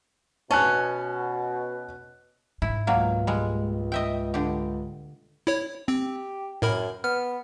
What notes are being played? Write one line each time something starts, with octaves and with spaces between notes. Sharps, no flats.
B2 C#4 A5 F#6
G#2 E4
C#2 B2 F#3 A#3
G3 G#3
D#5 E5 G5
D3 G4
E4 C#5
C4 G4
F#2 A2 A#4 B5
B3 F6